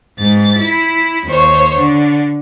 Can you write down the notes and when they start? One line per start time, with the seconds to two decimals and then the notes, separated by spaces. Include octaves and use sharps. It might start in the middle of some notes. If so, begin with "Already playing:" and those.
0.17 G#2 A6
0.59 E4
1.25 D#2 C5 C#5
1.75 D3